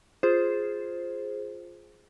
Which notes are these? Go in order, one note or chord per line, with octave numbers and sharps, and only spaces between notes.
F4 G#4 C5